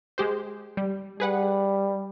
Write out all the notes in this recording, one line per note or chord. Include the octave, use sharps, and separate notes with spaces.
G#3 G4 C5
G3
G3 G#4 B4 F#5